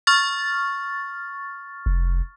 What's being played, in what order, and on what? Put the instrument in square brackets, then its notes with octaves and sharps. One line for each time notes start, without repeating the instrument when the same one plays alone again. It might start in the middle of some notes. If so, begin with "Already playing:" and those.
[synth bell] C#6 F6 A6
[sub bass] F1